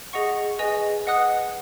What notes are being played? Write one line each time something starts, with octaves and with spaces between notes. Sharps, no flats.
G#4 D#5 F#5 C#6
G#4 B4 D#5 G#5
B4 D#5 F#5 D#6 F#6